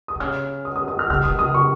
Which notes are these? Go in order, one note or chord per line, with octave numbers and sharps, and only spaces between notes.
D#6
C3
C#3 F6
D#6
D#6
D#6
F6
C#3 F6
D#3 D#6
C#3 D#6
C#6